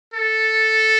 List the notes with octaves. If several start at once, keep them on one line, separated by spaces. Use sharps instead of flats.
A4